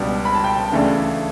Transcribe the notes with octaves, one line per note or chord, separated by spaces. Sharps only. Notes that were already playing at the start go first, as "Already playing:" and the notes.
Already playing: C#2 B2 G3 D4
B5
A5
G5
A5
D2 C#3 E3 A3 D4